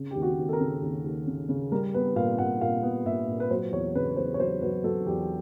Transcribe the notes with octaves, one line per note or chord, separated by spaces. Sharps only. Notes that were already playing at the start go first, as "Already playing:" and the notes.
Already playing: C#3
D#2 G4
F#4
D#2
A4
A#4
C#3
D#2
D#2
C#3
C#3
G3 A#4
B3 B4
A#2 F5
A#2 F#5
A#2 F5
B3
A#2 E5
A#2
B4
F#3 C5
E2 C#5
C#3 B4
E2 C5
C#5
F#3 C5
F#3 B4
F#3 A4
E2 G4